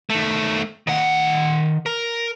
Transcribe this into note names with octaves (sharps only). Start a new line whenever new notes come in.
D#3 A3
D#3 F#5
A#4